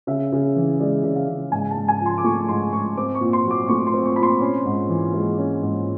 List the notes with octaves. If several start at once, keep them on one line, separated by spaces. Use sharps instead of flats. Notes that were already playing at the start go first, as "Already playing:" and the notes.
C#3 E5
C#3
E3
G#3 D5
C#3
F5
C#3
G#2 G#5
A5
G#2
G#5
F3
C6
D6
A3 C#6
G#2 C6
G#2 C#6
C4 D6
C#6
A#2
C6
F#3
D6
A3 C#6
C6
C4
C#6
A#2 B5
C6
C#4
G#2
E3
G#3
C#4
G#2